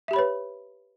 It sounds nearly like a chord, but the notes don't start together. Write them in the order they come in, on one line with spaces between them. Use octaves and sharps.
E5 G4 B5 C#5 B4